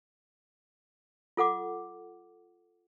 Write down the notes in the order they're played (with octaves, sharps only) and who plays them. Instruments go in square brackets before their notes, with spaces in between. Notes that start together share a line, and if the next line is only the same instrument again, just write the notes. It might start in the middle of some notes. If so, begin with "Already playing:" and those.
[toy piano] F4 A4 F#5 D6